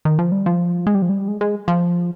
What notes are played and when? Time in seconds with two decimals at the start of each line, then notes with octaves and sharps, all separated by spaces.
0.05 D#3
0.19 F3
0.32 G3
0.46 F3
0.87 G#3
0.95 G3
1.02 F3
1.09 G3
1.28 G#3
1.41 G#3
1.68 F3